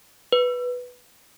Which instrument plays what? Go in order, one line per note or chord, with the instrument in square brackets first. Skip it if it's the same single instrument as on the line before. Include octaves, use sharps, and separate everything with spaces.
[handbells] B4